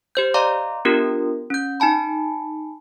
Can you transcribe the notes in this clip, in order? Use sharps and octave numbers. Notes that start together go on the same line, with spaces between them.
G4 C5 G6
D5 D#5 F5 A#5 C6 D6
B3 D4 F4 G4 A#4
C#4 G6
D#4 G#5 A5 B5